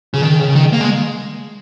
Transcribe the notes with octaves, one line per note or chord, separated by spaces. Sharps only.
C#3
D#3
C#3
D#3
A#3
G#3